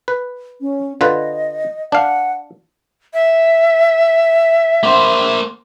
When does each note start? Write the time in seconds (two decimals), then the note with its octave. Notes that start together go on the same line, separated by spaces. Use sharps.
0.08 B4
0.61 C#4
1.01 D3 F4 B4 D#5
1.92 D4 F5 F#5
3.14 E5
4.83 A#3 C5